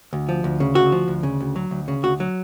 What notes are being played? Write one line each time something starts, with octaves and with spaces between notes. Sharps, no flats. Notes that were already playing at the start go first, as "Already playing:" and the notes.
D2
F3
D2
C#3
D2 F#4
F3
D2
C#3
D2
F#3
D2
C#3
D2 F#4
F#3